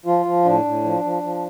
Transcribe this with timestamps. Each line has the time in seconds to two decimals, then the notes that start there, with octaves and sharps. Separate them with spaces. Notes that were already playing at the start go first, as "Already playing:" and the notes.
0.05 F3 F4
0.26 F3
0.45 A2 D4
0.65 A2
0.84 F3
1.04 F3
1.23 F3